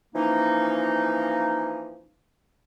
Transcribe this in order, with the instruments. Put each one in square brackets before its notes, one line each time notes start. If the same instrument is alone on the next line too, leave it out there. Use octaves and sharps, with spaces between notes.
[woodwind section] E3 F3 A#3 C#4 D#4